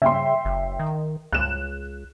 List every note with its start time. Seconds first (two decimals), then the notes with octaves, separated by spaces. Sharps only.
0.02 C#3 E5 G5 C6
0.45 F#1
0.79 D#3
1.32 C#2 F#6 E7